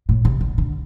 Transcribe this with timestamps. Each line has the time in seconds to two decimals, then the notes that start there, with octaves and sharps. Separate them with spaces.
0.09 A2
0.25 C3
0.41 D3
0.58 D3